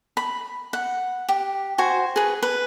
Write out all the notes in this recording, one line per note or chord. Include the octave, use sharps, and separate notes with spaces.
B5
F#5
G4
F#4 C5 G#5
G#4 B4
B4